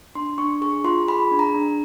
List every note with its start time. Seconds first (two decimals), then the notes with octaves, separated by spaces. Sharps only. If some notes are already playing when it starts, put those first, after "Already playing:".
0.15 D4 C6
0.38 D4 C#6
0.61 G#4 C#6
0.84 F4 C6
1.08 G#4 B5
1.31 D4
1.39 A#5
1.55 D4